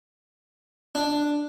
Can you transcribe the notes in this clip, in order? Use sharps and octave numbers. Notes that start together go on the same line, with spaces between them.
D4